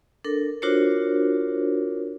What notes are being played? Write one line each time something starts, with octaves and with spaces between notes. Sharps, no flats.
D4 A4 A#4
D4 F4 F#4 A#4 C5 C#5